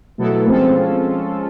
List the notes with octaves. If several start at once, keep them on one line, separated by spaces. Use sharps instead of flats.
B2 F#3 A3 B3 E4 A4
F3 G#3 C4 C#4 F4 A4